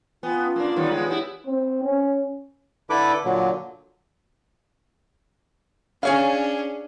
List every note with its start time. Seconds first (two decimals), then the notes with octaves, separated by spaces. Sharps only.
0.23 B3 F4 G5 G#5
0.38 C#4 A5
0.56 A#3 D4
0.76 D#3 G3 B3 C#5
0.91 G#3 B3
1.06 B3 E4 G4
1.46 C4
1.83 C#4
2.90 D3 E4 A4 B4 D6
3.25 A#2 D3 F#3
6.03 C#4 D4 G#4 C#5 F5